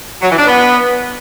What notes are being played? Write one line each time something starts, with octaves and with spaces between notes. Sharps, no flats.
F#3
E3
D4
B3